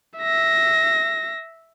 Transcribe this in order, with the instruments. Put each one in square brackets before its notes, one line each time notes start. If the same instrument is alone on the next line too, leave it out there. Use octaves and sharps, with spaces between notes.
[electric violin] E5 A#6